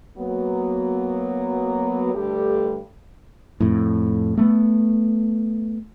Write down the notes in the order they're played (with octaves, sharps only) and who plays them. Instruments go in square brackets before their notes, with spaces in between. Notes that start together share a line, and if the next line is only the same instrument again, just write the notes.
[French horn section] F#3 A#3 B3
G2 D3 A3 G4
[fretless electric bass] F2 A2
A3 B3